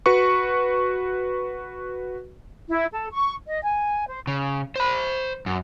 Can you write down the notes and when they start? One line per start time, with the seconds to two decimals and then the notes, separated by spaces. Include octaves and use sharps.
0.06 F#4 B4 C#6
2.68 E4
2.91 A4
3.11 C#6
3.47 D#5
3.63 G#5
4.07 C5
4.27 C#3
4.76 C5 B5
5.46 F#2